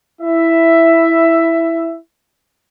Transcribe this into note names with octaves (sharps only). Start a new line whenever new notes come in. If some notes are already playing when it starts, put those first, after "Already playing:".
E4 E5